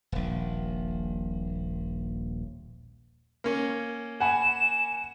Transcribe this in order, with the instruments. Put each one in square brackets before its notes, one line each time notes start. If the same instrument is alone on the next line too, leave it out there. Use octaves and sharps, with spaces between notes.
[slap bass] D#1 A#1
[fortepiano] A#3 C#4
[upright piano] F#5 G#5 B5 [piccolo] E7